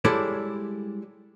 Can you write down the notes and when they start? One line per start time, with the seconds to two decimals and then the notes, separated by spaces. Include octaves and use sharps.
0.05 G3 G#3 E4 A4 C#5 D5